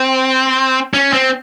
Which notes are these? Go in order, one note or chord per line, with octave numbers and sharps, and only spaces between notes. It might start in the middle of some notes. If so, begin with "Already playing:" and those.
Already playing: C4
C#4
C4